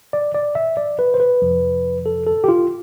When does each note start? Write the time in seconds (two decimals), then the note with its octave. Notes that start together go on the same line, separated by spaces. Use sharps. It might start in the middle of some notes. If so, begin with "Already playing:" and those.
0.13 D5
0.34 D5
0.55 E5
0.77 D5
0.99 B4
1.14 C5
1.20 B4
1.42 F2 C3 F3
2.06 A4
2.26 A4
2.44 G4
2.48 F4